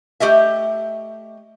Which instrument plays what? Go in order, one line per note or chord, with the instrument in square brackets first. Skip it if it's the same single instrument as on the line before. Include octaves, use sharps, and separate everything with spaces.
[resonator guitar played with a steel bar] A3 G4 D#5 E5